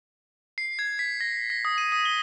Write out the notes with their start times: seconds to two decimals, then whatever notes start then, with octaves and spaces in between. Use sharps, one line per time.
0.58 C7
0.79 G#6
0.99 B6
1.20 A#6
1.50 A#6
1.65 D#6
1.78 D#7
1.92 D#6
2.05 G7